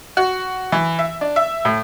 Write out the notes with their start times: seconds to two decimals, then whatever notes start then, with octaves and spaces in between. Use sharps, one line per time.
0.17 F#4
0.72 E3
0.99 E5
1.21 D4
1.36 E5
1.65 A2